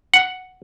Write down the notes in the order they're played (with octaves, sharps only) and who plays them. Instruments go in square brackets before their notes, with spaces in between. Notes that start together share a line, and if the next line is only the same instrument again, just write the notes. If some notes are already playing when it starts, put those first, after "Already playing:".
[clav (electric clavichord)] F#5